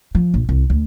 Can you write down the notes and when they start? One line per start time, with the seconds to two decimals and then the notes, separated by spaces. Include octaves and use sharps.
0.15 F3
0.34 A#1
0.49 C2
0.70 D2